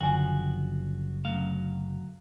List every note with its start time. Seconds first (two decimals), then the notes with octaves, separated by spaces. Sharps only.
0.01 F#1 D3 F3 F#4 G5 G#5
1.25 D2 F#3 A3 C#4 F5